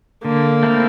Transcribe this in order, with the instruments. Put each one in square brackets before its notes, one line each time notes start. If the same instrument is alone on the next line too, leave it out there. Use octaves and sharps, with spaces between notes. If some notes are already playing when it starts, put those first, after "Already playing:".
[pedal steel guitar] D3 [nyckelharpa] A#3
[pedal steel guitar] A3 C4 E4 A#4